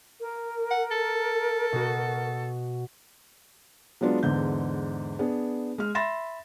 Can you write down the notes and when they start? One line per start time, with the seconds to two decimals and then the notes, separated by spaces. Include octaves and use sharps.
0.21 A#4
0.71 F#5
0.91 A4
1.72 B2 F#4
4.01 F#3 G#3 B3 D4 F4
4.23 E2 G#2 D3 G6
5.19 B3 D4 G#4
5.78 G#3 F6
5.95 E5 B5 C6 A6 A#6 E7